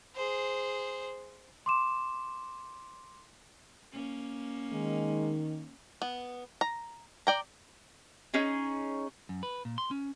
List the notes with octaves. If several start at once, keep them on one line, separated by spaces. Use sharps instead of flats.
G#4 C5
C6 D6 E7
A#3 C#4
D#3 G#3
B3
A#5
D5 G5 A#5
C#4 D#4 G#4
F#2
B4
A#2
C6
C#4